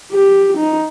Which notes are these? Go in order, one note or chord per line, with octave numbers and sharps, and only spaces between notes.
G4
D#4